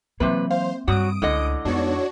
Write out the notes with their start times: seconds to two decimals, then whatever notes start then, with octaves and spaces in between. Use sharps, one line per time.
0.20 C3 E3 F#3 A#3 C4 B4 E5
0.50 C5 F5
0.87 G2 F#3 G3 F#4 D#6 D7
1.22 C#2 A2 D3 D#5
1.65 F2 G#3 B3 D4 D#4 F#4 C#5